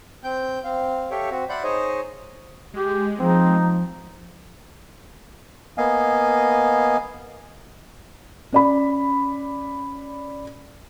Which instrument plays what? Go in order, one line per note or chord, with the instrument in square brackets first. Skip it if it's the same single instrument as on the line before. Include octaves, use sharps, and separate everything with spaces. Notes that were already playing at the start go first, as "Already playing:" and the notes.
[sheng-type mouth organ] C4 G5 G6
C4 F5
G4 A4 C#5 E5 F5 G5
C4 F#4
D5 E5 F#5 B5 C6 G6
D#4 G#4 C5 C#5 D#5
[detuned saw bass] G#3 [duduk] G4
[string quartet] F3 [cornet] C4 [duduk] D#4
[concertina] A#3 B3 D#5 F5 G#5
[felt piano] C#4 D5 B5